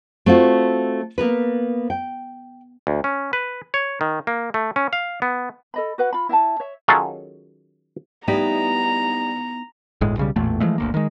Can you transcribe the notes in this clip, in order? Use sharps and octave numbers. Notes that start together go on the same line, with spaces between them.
A3 C4 F4 F#4
A#3 B3 A#4 B4
G5
D2
C#4
B4
C#5
D#3
A#3
A3
C#4
F5
B3
A4 D#5 B5
F#4 B4 F#5
F4 B5
E4 E5 F5 A5
C#5 E5
D#3 F#3 C#4 F4 G#4 A4
G3 B3 D#4 E4 A#5
G1 D2 A2 G#3
B1 C#3 G3
A1 E2 A#2 A3
E3 F3 G#3 A3
G1 D2 A#3
D#3 G#3